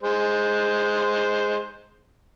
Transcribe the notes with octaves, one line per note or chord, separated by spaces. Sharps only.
G#3 C5